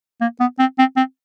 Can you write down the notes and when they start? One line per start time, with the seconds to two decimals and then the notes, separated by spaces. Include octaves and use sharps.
0.21 A#3
0.40 B3
0.59 C4
0.79 C4
0.97 C4